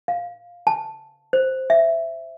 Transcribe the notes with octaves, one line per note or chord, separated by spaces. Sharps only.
F5
A5
C5
E5